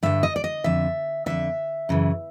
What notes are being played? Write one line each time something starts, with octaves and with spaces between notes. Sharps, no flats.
G2 D3 E5
D#5
D5
D#5
F2 D3 E5
F2 D3 E5
F#2 C#3 E3